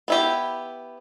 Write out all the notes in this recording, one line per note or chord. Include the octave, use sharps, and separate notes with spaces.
B3 E4 G4